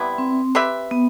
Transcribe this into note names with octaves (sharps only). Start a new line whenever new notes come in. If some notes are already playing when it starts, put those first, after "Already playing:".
Already playing: C3 G3 B3 E4
C4
C4 G4 B4 E5
B3